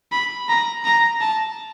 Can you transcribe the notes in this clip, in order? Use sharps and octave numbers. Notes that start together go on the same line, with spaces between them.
B5
A#5
A#5
A5